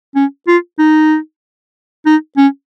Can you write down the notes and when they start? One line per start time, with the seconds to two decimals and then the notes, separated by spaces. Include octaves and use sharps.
0.15 C#4
0.47 F4
0.78 D#4
2.06 D#4
2.37 C#4